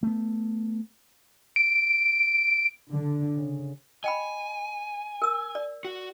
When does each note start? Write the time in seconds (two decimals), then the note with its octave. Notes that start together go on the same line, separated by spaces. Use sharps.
0.03 A3 B3
1.56 D7
2.90 D3
3.36 C#3
4.04 D#5 G5 G#5 B5
5.22 A#4 E6
5.55 D5
5.85 F#4